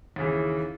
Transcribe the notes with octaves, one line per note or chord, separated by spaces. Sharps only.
D#2 C#3 E3